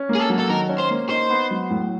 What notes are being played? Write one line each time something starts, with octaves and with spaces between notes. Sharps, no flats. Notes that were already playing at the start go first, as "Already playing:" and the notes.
Already playing: C#4
A#3
G#4
A4
F#3
A4
D#3 A#4
C#4
C5
A#3
D#4 C5
B3
F#3
A2